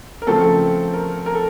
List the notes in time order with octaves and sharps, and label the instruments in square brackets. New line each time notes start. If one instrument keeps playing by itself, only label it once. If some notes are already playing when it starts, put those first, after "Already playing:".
[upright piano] A#4
C#3 F3 A3 C4 A4
A#4
A#4
A4